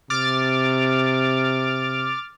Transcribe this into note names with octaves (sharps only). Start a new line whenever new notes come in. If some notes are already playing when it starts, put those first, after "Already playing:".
C3 D6 F6 A6